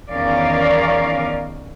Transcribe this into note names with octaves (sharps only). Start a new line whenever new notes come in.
E2 D#3 C#4 A#4 D5 F5